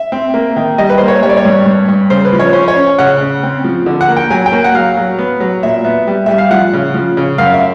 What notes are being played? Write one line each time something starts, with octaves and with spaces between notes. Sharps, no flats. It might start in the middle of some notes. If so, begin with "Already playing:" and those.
Already playing: E5
C4
A#3
D#3
G3 D#5
B4
A#3 C5
C#5
G3 C#5
D5
C#5
G2
G2
G2
C#3 C5
B4
F3
C#5
C#4 C5
C#5
C#4
C#3 F#5
C#3
C4
F3
D3
F#5
A#3
G5
F#3 G#5
G5
A#3
F#5
F#3 F5
F#3
B3
F#3
A#2 E5
B3
G3
G3 E5
F5
F3 F#5
C#3
F3
C#3
F#2 F5
E5